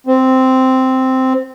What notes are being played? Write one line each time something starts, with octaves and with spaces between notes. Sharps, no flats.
C4